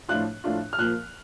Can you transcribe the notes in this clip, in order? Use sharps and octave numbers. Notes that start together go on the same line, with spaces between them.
A2 F3 A3 D4 F4 F#6
A2 F3 A3 D4 F4
F6
A#2 F3 A#3 F#6